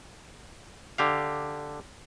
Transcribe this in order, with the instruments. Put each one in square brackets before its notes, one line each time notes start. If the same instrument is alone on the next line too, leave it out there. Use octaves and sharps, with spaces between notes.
[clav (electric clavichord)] D3 G4 F5